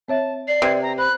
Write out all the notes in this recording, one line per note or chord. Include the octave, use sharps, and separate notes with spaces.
C4 C#5 E5 A5
D5 C7
C3 B4 G#6
A#5
C5 B5 F#6